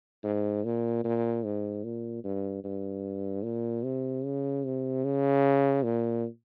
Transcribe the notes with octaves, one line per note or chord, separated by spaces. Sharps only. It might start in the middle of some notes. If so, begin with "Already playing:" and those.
G#2
A#2
A#2
G#2
A#2
G2
G2
A#2
C3
C#3
C3
C#3
A#2